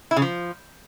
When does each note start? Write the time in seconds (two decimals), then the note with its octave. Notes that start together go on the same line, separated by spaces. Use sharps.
0.11 E4
0.16 C#3
0.22 F3